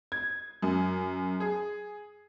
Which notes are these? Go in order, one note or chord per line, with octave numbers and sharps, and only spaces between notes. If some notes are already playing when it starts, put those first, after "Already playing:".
G#6
F#2
G#4